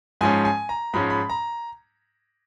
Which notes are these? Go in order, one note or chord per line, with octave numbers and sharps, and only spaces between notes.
G#2 F3 G#3 C#4 G#5
G#5
A#5
G#2 F3 G#3 C#4 B5
B5
A#5